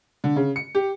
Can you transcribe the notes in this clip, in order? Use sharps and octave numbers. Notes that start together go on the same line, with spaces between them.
D3
C#3
C#7
G4